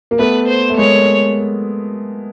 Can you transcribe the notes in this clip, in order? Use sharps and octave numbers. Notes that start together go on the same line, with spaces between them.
A#3
A3 B3 B4
C5
A3
G#3 A#3 C#5